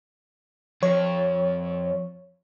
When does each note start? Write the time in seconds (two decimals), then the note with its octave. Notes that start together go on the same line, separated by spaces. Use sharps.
0.83 F2 C#5